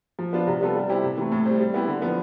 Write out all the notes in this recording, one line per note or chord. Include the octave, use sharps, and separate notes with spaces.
F3
B3 D4 F4
C3
G3 B3 F4 A4
G3
C4 E4 G4
C3
E3 A3
A2
G3 C4
G3
B3 E4 G4
D3
F3 B3